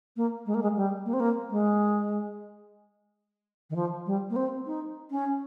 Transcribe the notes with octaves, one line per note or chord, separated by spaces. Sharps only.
A#3
G#3
A#3
G#3
G3
A#3
C4
A#3
G#3
D#3
F3
G3
A#3
C4
D#4
C#4